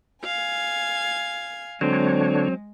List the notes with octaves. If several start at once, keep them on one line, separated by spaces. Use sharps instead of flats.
F5 G#5 G#6
D3 F#3 G#3 C4 D4 C#5